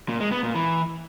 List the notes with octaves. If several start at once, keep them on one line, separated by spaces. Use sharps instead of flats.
A#2
G#3
B3
A#2
E3